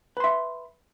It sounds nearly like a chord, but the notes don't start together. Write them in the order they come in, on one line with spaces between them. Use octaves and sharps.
B4 C6 E5